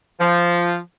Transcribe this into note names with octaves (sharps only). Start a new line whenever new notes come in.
F3